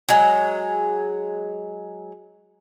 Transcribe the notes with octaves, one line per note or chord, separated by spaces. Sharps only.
F#3 G#3